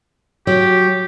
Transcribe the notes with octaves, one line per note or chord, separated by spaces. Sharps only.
F#3 G4